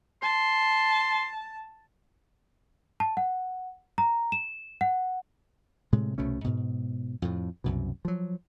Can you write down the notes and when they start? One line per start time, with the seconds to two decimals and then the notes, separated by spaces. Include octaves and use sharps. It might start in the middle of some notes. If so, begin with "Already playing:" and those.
0.22 A5 C6
3.00 A5
3.17 F#5
3.98 A#5
4.32 E7
4.81 F#5
5.92 A2 C3 G#3
6.18 C2 B2 A3 C#4
6.44 G#2 B2
7.22 F2 A2
7.64 C2 F#2 B2
8.05 F3 F#3